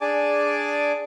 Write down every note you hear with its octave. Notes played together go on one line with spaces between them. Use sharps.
D4 G#4 D5 G#5 A5 D6